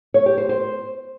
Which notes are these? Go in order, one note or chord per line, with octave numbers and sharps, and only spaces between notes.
C#5
G4
C5
C5